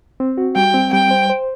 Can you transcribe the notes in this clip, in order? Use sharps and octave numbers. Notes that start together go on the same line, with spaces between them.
C4
F#4
G3 G5
C4
G3 G5
C5
C5